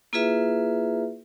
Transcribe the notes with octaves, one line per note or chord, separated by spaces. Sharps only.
A#3 E4 F4 G#4 B4 E5